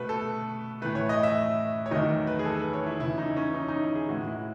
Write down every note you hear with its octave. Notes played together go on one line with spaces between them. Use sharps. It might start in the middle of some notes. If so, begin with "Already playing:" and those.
Already playing: B2 A3 B4
A4
A2 E3 A3 B4
C#5
D#5
E5
C#5
E2 D#3 F#3 A3 D#5
B4
G#4
A4
B4
C#5
E4
E2 C#3 E3 E4
D#4
C#4
D#4
D#4
E4
G#4
A2 E3 G#3 F#4
E4